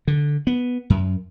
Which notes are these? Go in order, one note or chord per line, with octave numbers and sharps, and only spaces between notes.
D3
B3
F#2